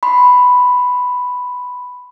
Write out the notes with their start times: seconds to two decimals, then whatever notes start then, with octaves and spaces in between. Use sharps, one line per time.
0.03 B5 C6